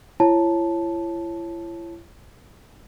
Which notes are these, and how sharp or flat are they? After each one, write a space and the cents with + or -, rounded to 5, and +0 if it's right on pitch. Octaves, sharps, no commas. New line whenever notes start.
E4 +40 C#5 -15 A5 -5